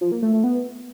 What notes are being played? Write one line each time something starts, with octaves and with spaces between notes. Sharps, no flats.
F3
A#3
A3
A3
B3